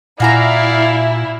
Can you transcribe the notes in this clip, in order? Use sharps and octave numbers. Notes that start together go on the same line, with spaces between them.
A#2 E4 F#4 D5 F5 G#5 A#5